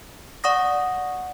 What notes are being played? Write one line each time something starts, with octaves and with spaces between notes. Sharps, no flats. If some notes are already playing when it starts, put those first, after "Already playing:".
D5 F#5 C#6 D#6 A#6